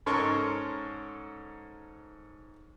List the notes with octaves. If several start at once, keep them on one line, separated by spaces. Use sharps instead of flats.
G#2 C#4 A4 A#4 C6 C#6